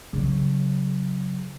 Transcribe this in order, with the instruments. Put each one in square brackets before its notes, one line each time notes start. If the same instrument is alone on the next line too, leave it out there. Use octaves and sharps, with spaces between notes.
[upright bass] C#3 F#3